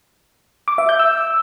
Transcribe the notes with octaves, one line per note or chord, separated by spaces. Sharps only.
D6
E5
G6
E6